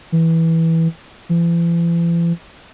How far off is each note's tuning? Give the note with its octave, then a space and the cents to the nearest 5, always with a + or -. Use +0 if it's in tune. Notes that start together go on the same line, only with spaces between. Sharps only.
E3 -10
E3 +45